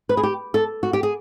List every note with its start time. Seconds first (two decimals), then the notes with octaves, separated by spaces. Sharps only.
0.09 B4
0.17 G#4
0.23 G4
0.54 A4
0.83 F#4
0.93 G4
1.03 G#4